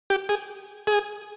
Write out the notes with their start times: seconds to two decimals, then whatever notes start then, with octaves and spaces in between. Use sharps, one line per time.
0.10 G4
0.29 G#4
0.87 G#4